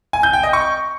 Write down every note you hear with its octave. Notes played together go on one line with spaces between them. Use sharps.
G#5
G6
G5
D#5
C#6